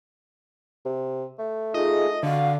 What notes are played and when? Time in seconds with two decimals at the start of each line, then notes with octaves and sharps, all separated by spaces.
0.86 C3
1.39 A3
1.74 D#4 F4 G#4 D#5
2.23 D3 F#4 F5